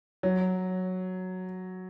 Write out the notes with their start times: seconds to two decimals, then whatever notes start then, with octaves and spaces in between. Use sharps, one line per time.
0.23 F#3